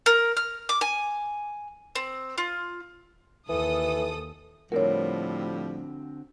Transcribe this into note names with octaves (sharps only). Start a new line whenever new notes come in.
A#4
F6
D6
G#5
C4
F4
D#2 E3 A4 D#6
A2 D3 F3 G3 C4 F#4 A#4 C#5